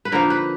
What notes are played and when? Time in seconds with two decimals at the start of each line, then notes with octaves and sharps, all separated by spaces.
0.05 B4
0.12 D3 F3 A#3 D#4 A#4
0.30 B4